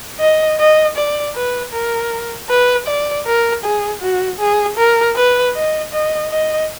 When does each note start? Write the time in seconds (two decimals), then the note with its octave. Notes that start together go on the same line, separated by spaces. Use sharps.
0.20 D#5
0.59 D#5
0.96 D5
1.35 B4
1.73 A#4
2.49 B4
2.87 D5
3.26 A#4
3.64 G#4
4.02 F#4
4.39 G#4
4.77 A#4
5.16 B4
5.54 D#5
5.92 D#5
6.30 D#5